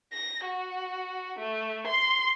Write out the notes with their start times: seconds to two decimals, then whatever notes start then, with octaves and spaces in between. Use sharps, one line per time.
0.12 A#6
0.45 F#4
1.39 A3
1.87 C6